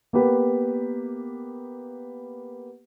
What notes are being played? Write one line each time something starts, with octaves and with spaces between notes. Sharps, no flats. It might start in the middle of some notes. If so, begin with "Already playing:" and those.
A#3 B3 G4 B4